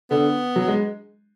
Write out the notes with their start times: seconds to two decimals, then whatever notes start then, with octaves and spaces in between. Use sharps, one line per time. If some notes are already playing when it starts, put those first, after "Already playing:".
0.11 D3 B3
0.56 F#3
0.68 G#3